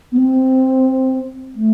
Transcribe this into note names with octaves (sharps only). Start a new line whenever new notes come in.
B3
C4
A3